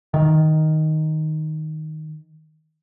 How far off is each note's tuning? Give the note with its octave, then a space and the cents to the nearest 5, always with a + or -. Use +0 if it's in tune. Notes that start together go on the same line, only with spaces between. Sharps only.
D#3 +0